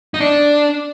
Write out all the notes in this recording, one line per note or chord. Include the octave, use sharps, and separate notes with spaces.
D#4
D4